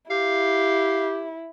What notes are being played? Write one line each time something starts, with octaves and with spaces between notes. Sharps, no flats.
E4 G4 F5